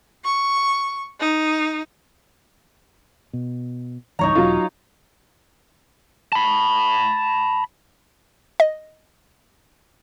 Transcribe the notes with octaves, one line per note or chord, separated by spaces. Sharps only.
C#6
D#4
B2
C#2 G2 E3 D#4 C#5 A#5
E1 F#3 F4
A5 B5
D#5